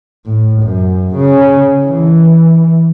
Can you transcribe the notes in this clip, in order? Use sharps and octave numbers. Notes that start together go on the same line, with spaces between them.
A2
F#2
C#3
E3